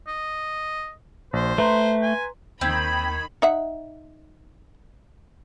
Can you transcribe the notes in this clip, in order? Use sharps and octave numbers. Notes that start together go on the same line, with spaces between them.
D#5
A#1 C5
A3 B4 A#5 C6
G#5
D#2 D#3 C4 B5 G6 G#6 B6
D#4 E5 F#5